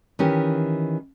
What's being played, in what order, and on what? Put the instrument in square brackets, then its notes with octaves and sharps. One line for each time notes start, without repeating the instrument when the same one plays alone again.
[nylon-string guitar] D#3 E3 C#4 G4